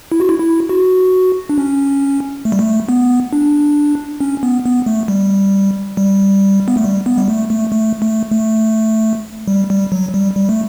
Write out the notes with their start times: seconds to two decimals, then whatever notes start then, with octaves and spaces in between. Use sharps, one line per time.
0.12 E4
0.20 F#4
0.29 E4
0.40 E4
0.69 F#4
1.50 D4
1.58 C#4
2.45 A3
2.52 G3
2.59 A3
2.89 B3
3.33 D4
4.21 C#4
4.43 B3
4.66 B3
4.86 A3
5.08 G3
5.97 G3
6.68 B3
6.77 A3
6.84 G3
7.06 B3
7.17 G3
7.28 A3
7.50 A3
7.72 A3
8.02 A3
8.31 A3
9.48 G3
9.70 G3
9.92 F#3
10.14 G3
10.36 G3
10.49 A3